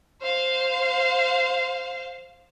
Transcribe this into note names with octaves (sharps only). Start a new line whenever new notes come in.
C5 F5